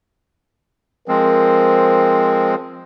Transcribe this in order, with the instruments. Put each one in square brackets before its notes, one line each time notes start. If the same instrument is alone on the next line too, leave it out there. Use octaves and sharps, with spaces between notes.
[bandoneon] F3 G#3 C4 [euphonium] A#4